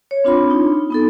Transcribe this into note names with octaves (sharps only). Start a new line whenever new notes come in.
C#5
C4 D4 F4 B5 C6
D#4
B3 D#4 A4